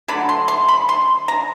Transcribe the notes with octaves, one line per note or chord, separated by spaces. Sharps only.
D3 F#3 A3 B5
C6
C6
B5
C6
A#5